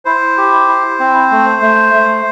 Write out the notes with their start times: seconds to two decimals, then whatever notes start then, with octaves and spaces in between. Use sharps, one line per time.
0.05 E4 C5
0.38 G4
0.68 E4
1.00 C4
1.31 A3
1.62 A3
1.94 A3